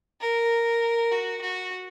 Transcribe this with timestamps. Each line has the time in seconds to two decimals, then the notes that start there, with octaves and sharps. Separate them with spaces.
0.20 A#4
1.11 F#4
1.41 F#4